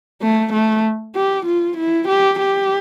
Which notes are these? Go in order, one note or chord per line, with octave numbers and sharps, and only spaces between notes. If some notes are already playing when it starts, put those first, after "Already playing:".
A3
A3
G4
F4
E4
G4
G4